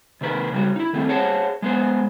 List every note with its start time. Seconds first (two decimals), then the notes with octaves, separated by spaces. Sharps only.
0.21 C3 D#3 A#3 B4
0.52 C#3 G3 F#4
0.76 D#4 E4
0.93 D#3 A3 C4
1.09 G#4 C5 C#5 F#5 A5
1.62 G#3 B3 C5